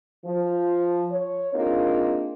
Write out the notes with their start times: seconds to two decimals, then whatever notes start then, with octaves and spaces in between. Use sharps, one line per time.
0.25 F3
1.12 C#5
1.54 A#3 C4 D4 D#4 F4 G#4